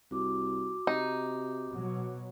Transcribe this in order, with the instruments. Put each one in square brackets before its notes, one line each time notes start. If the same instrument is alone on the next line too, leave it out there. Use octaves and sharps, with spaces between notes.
[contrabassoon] C2 [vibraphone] F#4 D6
[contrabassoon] C3 [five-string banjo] D#4
[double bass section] B2 F#3